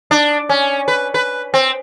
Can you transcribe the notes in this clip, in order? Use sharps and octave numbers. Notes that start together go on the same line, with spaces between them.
D4
C#4
B4
B4
C4